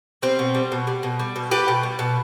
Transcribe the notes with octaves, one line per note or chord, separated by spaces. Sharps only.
G3 C4
B2
G3
B2
G3
B2
G3
B2
G3 G4 B4
B2
G3
B2